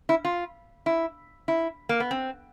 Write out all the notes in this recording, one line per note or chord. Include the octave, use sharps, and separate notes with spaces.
E4
F4
E4
E4
A#3
B3
C4